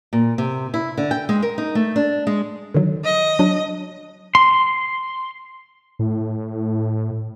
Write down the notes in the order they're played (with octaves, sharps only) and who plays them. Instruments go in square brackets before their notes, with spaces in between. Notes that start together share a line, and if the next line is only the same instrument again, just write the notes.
[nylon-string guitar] A#2
C3
E4
D3
G5
G#3
A#4
D#4
A3
D4
G#3
[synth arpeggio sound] D3 D#3 F#3
[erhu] D#5
[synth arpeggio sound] F#3 D4
[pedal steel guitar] C6
[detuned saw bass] A2